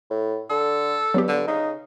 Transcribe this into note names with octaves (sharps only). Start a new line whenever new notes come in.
A2
D3 A4
G2 F#3 B3 G4
D3
C#3 D#4